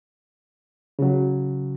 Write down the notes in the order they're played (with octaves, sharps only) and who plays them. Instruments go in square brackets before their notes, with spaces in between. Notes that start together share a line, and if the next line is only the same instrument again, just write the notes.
[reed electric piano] C#3 F#3